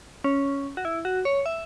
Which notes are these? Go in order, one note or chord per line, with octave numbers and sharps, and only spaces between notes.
C#4
F#4
E4
F#4
C#5
E5